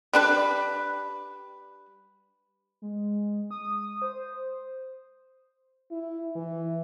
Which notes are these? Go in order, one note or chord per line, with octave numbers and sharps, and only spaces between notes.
G3 D4 B4
G#3
D#6
C5
E4
E3